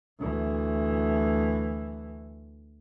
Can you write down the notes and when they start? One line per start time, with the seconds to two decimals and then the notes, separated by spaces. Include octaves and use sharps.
0.19 D2 E3